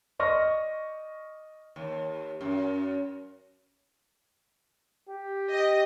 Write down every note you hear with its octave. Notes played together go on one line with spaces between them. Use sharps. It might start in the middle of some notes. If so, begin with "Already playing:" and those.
D5 D#5 C#6 F6 A#6
D#2
F#2
G4
D#5